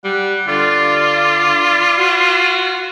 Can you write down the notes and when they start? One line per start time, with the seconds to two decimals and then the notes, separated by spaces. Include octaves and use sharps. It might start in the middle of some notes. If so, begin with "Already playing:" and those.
0.04 G3 F#5
0.48 D3 F4 D5
1.99 F#4